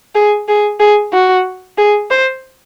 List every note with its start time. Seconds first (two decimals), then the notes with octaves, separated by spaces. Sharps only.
0.15 G#4
0.49 G#4
0.80 G#4
1.13 F#4
1.78 G#4
2.11 C5